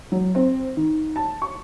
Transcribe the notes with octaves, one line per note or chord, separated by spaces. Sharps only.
F#3
C4
D#3
A5
C#6